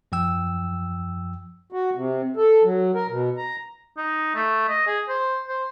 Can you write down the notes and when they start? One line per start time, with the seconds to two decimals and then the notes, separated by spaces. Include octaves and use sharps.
0.12 F#2 F3 G5 E6
1.72 F#4
1.95 C3
2.37 A4
2.64 F#3
2.94 A#4
3.09 B2
3.37 A#5
3.97 D#4
4.35 A3
4.69 D#5
4.87 G#4
5.09 C5
5.48 C5